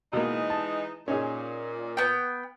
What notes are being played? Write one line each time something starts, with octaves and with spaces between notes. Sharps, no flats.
B2 E3 G#3 A#3 D#4
A5
A#2 C#4 D#4 G#4
B3 G5